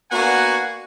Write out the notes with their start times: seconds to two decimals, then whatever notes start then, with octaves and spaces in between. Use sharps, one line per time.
0.12 A#3 B3 D4 F#4 F#5 G#5